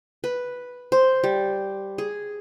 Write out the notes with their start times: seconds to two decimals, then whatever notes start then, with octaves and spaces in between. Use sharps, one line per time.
0.24 B4
0.92 C5
1.24 G3
1.98 G#4